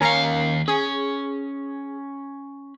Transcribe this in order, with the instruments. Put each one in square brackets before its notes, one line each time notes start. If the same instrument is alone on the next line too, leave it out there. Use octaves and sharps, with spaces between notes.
[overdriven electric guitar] D#2 F5 [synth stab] C#4 A#4 C#7
[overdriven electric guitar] C#4 [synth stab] G#4